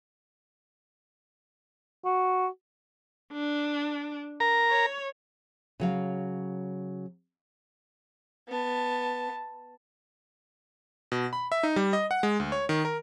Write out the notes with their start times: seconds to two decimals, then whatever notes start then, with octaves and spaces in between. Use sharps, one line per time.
2.05 F#4
3.33 D4
4.40 A#4 A#5
4.70 C#5
5.80 C#3 F#3 F5
8.48 B3 A5
11.12 B2
11.33 B5
11.52 E5
11.63 D#4
11.76 G3
11.93 D#5
12.11 F#5
12.23 G#3
12.40 D2
12.52 C#5
12.69 D#3
12.85 A#4